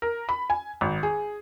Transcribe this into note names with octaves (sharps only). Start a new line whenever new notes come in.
A#4
B5
G#5
G#1
G#4